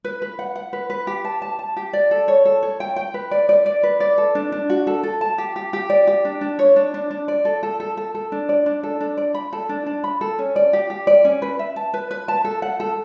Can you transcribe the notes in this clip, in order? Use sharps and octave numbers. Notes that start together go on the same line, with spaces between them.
B4
B4
F#5
F#5
B4
B4
G4
A5
A5
A5
G4
D5
A4
C#5
A4
C#5
G5
G5
B4
D5
D5
D5
B4
D5
A4
D4
D4
F#4
A4
A4
A5
G4
G4
G4
D5
G4
D4
D4
C#5
D4
D4
D4
D5
A4
A4
A4
A4
A4
D4
D5
D4
A4
D4
D5
B5
A4
D4
D4
B5
A4
C#4
D5
G4
G4
D5
C#4
B4
E5
A5
B4
B4
A5
A4
F#5
A4